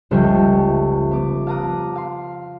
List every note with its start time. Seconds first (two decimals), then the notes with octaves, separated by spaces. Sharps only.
0.11 F1 C#2 G3 A4 E5 G5
1.11 B3 D6
1.47 F5 A5 A#5 D6 D#6 F#6
1.95 F5 C6